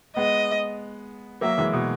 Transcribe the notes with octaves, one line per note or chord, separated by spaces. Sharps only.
G#3 B3 D#5
F#3 A#3 E5
E3 G#3
B2